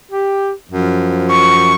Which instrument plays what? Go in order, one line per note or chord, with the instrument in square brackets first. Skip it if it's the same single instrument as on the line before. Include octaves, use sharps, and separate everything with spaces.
[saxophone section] G4
F#2 F3
[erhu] C#6